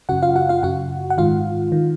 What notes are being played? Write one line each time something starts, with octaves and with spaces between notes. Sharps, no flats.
F#2 C#3 F#4 F#5
F4 F5
F#4 F#5
F4 F5
F#2 C#3 F#4 F#5
F#5
G#2 D#3 F4 F5
D#3